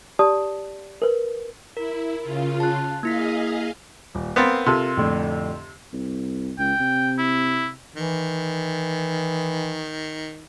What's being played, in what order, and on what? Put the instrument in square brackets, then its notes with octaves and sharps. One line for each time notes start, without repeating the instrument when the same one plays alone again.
[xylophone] G4 D5 A5 D#6
A#4 B4
[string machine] E4 [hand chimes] A#4
[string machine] C#3 F4
[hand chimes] A5 F#6
[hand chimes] A#3 E4 B6 [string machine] G#4 D#5 F5
[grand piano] D#1
[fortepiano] B3 C4 [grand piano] A#4 F5 A6
[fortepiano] C3 [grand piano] F4 A4 A#4
[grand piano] F2 A2 D3
[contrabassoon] C2
[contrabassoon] C#2 [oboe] G5
[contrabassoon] C3
[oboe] E4
[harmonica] D#3 [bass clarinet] E3